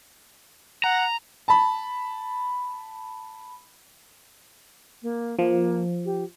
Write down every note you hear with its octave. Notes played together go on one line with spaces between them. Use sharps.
F#5 A#5
A5 B5
A#3
F3 A#3
G4